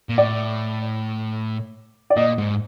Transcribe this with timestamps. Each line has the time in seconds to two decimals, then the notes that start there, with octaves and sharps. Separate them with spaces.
0.09 A#2
0.18 A2 D5
2.10 D5
2.16 A#2 D#5
2.38 G#2